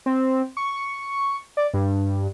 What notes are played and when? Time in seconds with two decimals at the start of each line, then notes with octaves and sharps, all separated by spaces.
0.06 C4
0.57 C#6
1.57 D5
1.74 G2